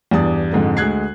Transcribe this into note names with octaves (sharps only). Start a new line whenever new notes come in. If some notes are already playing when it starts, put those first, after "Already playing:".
E2 G2 D5 D#6
F2 G#2 D3
D2 G#3 F#6 G#6 C7